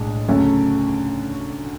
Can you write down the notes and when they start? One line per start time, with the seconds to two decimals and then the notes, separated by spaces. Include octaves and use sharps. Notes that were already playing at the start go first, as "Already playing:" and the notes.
Already playing: B1 A2 G#3 D4
0.28 D2 C#3 F#3 A3 C#4